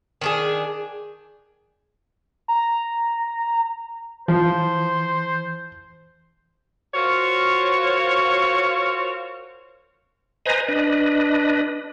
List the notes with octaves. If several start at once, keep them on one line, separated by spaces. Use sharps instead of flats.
D#3 D4 G#4
A#5
E3 F3 C5
F4 F#4 A#4 C5 C#5
B4 C5 D#5 G#5 A#5
D4 B4 D#5